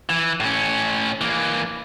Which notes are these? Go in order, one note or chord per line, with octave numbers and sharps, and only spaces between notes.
E3
A2 C#4
E3 A#3